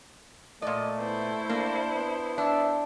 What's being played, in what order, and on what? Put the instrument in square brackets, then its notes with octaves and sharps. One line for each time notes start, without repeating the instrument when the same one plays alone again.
[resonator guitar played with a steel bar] A#2 D5 [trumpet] A3 [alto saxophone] D#5
[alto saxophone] B3 [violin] E4 C5
[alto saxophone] A#3 [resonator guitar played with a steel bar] D4
[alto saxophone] B3
[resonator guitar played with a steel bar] D4 [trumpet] E5